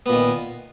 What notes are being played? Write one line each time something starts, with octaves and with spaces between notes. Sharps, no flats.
A#2 D#3 B3